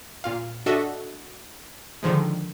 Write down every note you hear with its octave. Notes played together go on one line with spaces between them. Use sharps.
A#2 F4 F5
D4 F#4 A4 D#5 E5
D3 D#3 F3 G#3